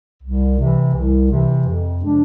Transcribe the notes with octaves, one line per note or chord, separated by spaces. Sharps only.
C2
C3 E3
C2
C3 E3
F2
C3 F3 G#3 D4